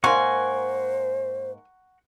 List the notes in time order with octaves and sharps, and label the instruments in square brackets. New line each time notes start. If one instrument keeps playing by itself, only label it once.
[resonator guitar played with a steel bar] G#2 A#3 [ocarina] C5 [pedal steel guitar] F#5 A#5 C#6 [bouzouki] G#5